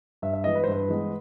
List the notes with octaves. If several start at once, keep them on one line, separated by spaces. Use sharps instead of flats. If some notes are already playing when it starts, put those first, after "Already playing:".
G2 E5
E5
E3 G#3 B3 D#5
B4
C5
G2 B4
E3 G#3 B3